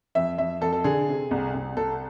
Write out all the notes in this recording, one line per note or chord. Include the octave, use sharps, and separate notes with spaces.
F2 E5
F2 E5
F2 A4
A4
D3 G#4
C3
C2
C2
C2 A4